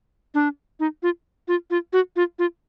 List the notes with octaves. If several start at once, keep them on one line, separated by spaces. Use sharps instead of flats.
D4
D#4
F4
F4
F4
F#4
F4
F4